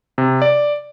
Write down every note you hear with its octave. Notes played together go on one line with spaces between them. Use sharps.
C3
D5